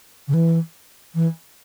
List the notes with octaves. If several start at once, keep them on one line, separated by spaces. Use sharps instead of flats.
C#3
E3
E3